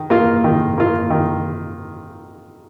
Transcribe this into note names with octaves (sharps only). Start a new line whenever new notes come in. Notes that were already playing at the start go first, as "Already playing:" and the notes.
Already playing: D#3
A#3 F4
D#3
A#3 F4
D#3